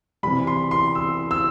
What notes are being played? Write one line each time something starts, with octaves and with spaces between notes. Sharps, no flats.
C3 E3 G3 B5
C6
C6
E6
E6